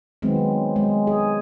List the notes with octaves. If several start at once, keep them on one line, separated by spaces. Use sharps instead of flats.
D#3 F#3 G#3 B3 C4
G#3
G#4